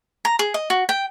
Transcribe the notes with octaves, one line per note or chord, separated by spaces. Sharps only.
A#5
G#4
D#5
F#4
G5